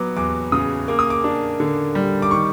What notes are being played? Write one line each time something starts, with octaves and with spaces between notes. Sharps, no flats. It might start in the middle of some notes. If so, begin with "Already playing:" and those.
Already playing: F#3 B3 D6
E2 D6
C#3 D#6
A#3 D6
D#6
D6
D4
D3
G3
D6
D#3 C#6